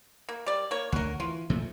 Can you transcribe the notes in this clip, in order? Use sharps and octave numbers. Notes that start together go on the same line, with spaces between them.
A#3
G3 D5
A#3 C#5
D2 D3 F#4 A#4
E3 F4
A#2 F3 A3